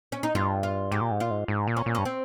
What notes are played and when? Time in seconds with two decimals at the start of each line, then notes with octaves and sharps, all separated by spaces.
0.12 C#4
0.23 D#4
0.35 G2 F4
0.63 F4
0.91 G#2 G4
1.01 A#2
1.11 G#2
1.20 A#2 F4
1.31 G#2
1.48 G#2
1.67 A#2
1.77 C#4
1.86 A#2
1.95 G2 C#4
2.05 C4